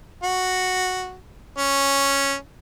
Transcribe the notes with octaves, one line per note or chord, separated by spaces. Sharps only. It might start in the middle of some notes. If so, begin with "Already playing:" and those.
F#4
C#4